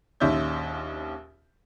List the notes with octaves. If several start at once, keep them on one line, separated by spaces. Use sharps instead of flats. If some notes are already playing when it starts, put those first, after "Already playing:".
A#1 D#2 C#4 E5 G6